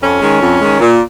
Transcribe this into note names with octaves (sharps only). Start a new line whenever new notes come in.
F2 C#4
D#3 G#3
F2
D#3 G#3
A#2